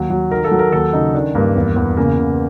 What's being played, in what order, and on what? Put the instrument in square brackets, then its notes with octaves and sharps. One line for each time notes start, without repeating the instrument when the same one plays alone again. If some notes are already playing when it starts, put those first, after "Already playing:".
Already playing: [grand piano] D#2 F#3
F#3
D#3 A#4
A4
F#3
A#4
D#2 A4
C#3 D#4
D#3 D4
G2 A#3
E2
E2
C#3 A#3
C#3